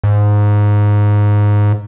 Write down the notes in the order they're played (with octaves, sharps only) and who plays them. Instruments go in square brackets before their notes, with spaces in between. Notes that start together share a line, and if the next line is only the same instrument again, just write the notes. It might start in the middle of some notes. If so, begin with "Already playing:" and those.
[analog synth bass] G#2